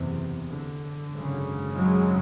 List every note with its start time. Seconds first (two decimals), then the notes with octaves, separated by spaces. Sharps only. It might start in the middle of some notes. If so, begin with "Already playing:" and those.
Already playing: F#1 E2 C3
0.48 D3
1.12 G#1 F#2 C#3
1.76 F#3 G#3